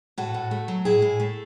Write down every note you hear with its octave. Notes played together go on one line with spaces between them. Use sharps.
A2 F#4 A4
A2
A3
F#3
A2 E4 G#4
A2
A3